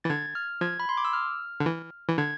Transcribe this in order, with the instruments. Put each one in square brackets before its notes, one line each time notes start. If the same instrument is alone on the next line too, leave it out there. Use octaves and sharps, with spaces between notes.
[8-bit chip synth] E3 [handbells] A6
[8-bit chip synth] D3 [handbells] G#6
[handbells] F6
[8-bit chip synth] F3 [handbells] G#6
[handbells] B5
C6
D6
E6
F6
[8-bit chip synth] D3
E3
E3
[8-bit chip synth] D3 [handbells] G#6